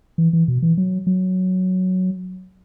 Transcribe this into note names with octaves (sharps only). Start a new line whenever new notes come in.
E3
E3
B2
E3
F#3
F#3